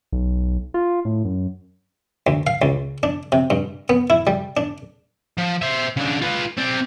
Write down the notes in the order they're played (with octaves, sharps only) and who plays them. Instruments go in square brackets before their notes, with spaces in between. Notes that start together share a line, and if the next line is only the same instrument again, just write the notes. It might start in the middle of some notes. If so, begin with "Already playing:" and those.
[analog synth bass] B1
F4
A2
F#2
[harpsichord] D2
F5
C#2
D4
C3
G2
B3
E4
G3
D4
[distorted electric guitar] F3
C5 E5
C#3 D4
F4 B4
C4 D5